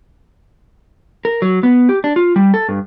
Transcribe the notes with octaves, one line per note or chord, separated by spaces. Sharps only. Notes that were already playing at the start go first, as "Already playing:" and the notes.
A#4
F#3
B3
G4
D4
F4
G3
A4
G2